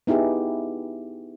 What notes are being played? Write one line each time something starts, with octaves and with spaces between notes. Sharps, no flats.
B3 D#4 E4 G4 G#4